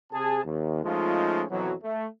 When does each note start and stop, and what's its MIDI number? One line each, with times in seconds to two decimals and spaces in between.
0.12 0.44 48
0.12 0.44 68
0.12 0.44 81
0.44 0.80 39
0.83 1.43 53
0.83 1.43 56
0.83 1.43 57
0.83 1.43 61
0.83 1.43 63
0.83 1.43 65
1.50 1.72 41
1.50 1.72 47
1.50 1.72 52
1.50 1.72 54
1.83 2.06 57